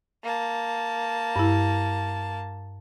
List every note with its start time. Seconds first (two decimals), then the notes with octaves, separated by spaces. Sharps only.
0.23 A#3 A5
1.36 G2 E4